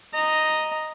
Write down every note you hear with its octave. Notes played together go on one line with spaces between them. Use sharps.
D#5 A#5